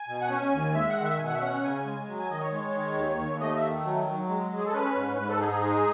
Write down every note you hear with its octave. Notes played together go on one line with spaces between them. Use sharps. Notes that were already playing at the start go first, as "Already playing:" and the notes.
Already playing: G#5
B2
F#5
C#4 G#5
D#2
G#3 E5
F#5
D#3
E5
B2 G#5
F#5
E5
C#4 F#5
C#3 G#5
G#3
F#3
G#5
D#3 D#5
C#5
G#3
D#3
D#2
D#2
A3 D#5
E5
D#3
F#3
F#3
G#3
G#3
G#4
A4
C#4 B4
G#2
G#2 B4
A4
D#4 G#4
G#4
G#3 G#4